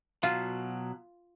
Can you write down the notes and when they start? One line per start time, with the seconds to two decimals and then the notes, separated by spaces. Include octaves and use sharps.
0.23 B2 F#3 F4